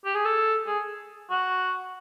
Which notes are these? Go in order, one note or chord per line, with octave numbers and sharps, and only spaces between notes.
G4
G#4
A4
G#4
F#4